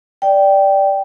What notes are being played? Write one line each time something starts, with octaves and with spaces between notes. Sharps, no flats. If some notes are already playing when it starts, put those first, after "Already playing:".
D5 G5